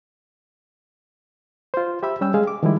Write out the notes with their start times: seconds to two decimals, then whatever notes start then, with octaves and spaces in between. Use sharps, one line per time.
1.74 F4 C5
2.03 G4 E5 B5 E6
2.21 G3 C#4 G5 E6
2.34 G#3 G#4 F5
2.47 D6
2.63 D#3 F3 G3 G#3 E4